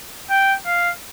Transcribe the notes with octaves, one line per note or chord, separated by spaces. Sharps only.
G5
F5